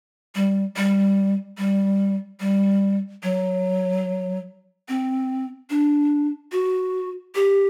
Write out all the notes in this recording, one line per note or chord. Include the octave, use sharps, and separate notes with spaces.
G3
G3
G3
G3
F#3
C4
D4
F#4
G4